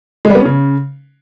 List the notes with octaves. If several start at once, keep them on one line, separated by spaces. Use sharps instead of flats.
G#3
G3
B3
C#4
C#3